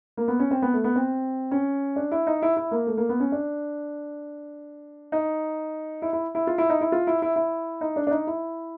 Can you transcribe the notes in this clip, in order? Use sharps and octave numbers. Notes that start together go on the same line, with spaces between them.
A#3
B3
C#4
C4
B3
A3
B3
C4
C#4
D4
E4
D#4
E4
E4
A#3
A3
A#3
B3
C#4
D4
D#4
E4
E4
E4
F4
E4
D#4
E4
F4
E4
E4
E4
D#4
D4
D4
D#4
E4